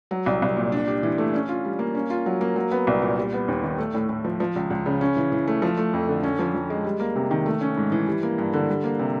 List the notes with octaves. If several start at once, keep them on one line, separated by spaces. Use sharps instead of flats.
F#3
C2
C2
A#2
D4
G4
E3
A3
C#4
F4
G3
A#3
C#4
F4
F#3
A#3
F#3
B3
C2
A#2
G3
B3
D#2
D#3
A3
A2
A2
F3
F3
C#2
C#2
C#3
C#4
E3
E3
A3
F3
A3
F2
D3
C#4
F3
F3
G#3
G3
A#3
C3
D#3
A3
C#4
G#2
E3
G3
A#3
G2
D3
G3
A#3
C3